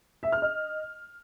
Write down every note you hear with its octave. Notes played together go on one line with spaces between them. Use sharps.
E5
F6
D#5